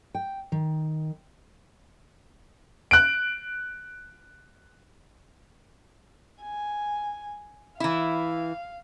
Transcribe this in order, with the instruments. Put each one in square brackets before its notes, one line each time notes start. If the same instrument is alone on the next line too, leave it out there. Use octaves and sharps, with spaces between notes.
[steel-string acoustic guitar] G5
D#3
[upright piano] F#6 D7
[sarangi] G#5
[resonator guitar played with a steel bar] E3 E4 [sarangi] F5